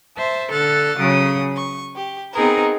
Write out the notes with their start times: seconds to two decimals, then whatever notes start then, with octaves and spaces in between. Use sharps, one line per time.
0.17 C5 E5 A5
0.50 D3 A4 F6 F#6 A6
0.98 C#3 F#3 D#6
1.57 C#6
1.95 G4
2.33 B3 C4 D#4 G#4 A#4 B4